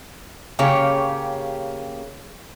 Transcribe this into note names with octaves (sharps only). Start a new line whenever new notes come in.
C#3 A#3 G4 C#5